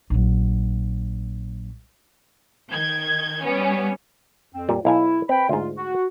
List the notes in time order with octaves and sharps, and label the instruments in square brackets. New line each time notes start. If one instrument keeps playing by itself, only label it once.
[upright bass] A#1 F#3
[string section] D#3 G6 G#6
G3 B3 C#4
[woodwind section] F2 C4
[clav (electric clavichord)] A#2 G3
[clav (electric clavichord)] B1 F5 G#5 [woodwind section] E4
[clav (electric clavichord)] C4 [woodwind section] B4 G5 B5
[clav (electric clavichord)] D2 G#2 [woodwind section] F4
[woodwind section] F#4